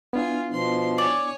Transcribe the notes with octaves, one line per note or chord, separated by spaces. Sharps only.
B3 D4 E4 F4 G#5
B2 F3 C6
C#5 D5 G#5